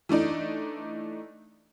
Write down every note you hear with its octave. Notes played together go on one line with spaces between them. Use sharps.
E3 A3 D4 D#4